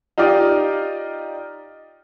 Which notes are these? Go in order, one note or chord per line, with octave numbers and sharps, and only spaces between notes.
D#4 F4 G4 D5 D#5